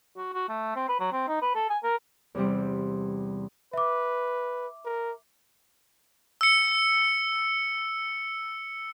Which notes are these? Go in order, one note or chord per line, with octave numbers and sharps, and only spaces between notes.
F#4
F#4
A3
C4
B4
F#3
C4
D#4
B4
A4
G#5
A#4
E2 C3 G3 C4
B4 E5 D6
A#4
E6 C#7